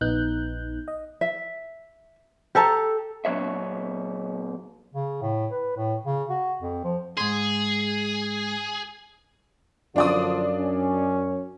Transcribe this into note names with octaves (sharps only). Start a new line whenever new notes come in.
A#1 B3 D#4 F#6 G6
D#5
E5
G4 A4 A5 A#5
A#2 F#3 C#5 E5
C#3
A2
B4
A2
C#3
F#4
F2
F3
G#2 G#4 C6
F#2 D3 F3 D4 F4 D5 D#6
C#4